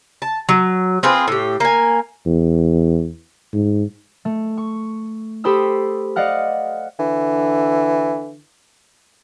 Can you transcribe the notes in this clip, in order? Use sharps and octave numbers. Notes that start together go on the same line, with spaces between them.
A5
F#3
C4 F4 G#4 B4
A2 G4
A#3 G#5
E2
G#2
A3
C#6
G4 A4 C5 B5 D#6 E6
D5 D#5 F5 F#5 F6
D3 E3